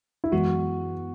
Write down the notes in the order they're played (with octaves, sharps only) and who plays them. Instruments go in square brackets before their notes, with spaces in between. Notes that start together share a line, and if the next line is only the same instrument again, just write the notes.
[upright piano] E4
[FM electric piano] F#2 E3 G#3 B3 [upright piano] F#4